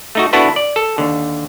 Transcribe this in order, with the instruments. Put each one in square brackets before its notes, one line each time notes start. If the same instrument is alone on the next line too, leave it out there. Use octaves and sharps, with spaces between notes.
[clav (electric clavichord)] A3 D#4 F#4
B3 D4 E4 F#4 A4 B4
D5
A4
D#2 D3